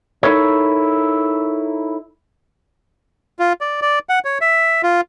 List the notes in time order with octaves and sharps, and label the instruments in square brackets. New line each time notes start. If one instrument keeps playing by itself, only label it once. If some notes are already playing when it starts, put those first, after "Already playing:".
[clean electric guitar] D#4 E4 A4 A#4 C#5
[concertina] F4
D5
D5
F#5
C#5
E5
F4